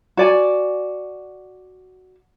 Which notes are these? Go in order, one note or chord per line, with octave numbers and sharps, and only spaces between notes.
F#4 D5 G#5